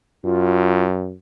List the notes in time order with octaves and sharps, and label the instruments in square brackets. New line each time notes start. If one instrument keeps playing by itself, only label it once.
[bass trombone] F#2 [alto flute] F4